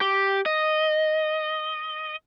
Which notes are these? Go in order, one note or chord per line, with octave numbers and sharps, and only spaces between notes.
G4
D#5